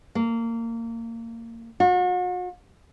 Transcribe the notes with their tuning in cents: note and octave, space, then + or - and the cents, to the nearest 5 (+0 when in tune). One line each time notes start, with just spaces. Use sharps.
A#3 -25
F#4 -40